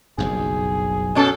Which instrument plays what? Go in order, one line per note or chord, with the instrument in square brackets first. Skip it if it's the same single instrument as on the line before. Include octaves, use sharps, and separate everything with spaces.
[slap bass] F#1 B1 G2 [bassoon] G#4
[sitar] B2 C#4 A4